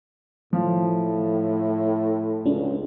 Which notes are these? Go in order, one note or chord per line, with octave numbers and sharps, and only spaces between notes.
A2 F3
C#2 C#4 D4